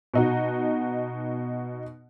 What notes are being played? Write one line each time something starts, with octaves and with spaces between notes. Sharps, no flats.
B2 D#4 F#4